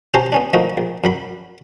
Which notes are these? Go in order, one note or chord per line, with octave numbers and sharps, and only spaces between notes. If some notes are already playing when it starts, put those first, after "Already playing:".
C#4 F#4 G4 C5 A5 A#5
B3 C#4 D4
F3 A3 A#3 D#4 F#4
A#1
F#2 F#3 B5